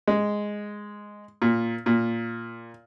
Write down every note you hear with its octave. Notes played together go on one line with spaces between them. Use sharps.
G#3
A#2
A#2